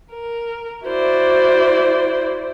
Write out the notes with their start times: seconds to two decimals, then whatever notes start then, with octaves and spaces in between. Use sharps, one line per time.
0.12 A#4
0.85 E4 F#4 C5 D5